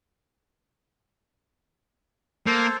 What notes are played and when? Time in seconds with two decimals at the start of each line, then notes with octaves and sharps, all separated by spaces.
2.46 A#3 A4 C5